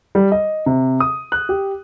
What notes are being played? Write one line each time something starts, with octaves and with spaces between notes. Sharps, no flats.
G3
D#5
C3
D#6
F#6
G4